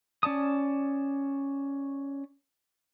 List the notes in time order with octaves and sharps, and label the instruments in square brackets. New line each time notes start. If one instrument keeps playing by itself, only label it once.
[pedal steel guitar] C#4 D5 A5 D#6